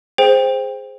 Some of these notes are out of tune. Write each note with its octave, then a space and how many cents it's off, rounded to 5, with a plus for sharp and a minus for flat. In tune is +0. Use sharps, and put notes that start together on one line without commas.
G#4 +0 C5 +0 G5 +20